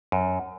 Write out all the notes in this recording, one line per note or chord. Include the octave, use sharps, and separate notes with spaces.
F#2